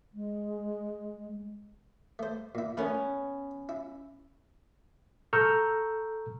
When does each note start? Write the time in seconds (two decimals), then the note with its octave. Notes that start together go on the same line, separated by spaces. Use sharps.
0.14 G#3
2.19 A3 C5
2.55 A#2 E4
2.77 A3 B3 C#4 A#4 B4
3.69 E4
5.33 A4 A#5 C#6 E6 F6 G6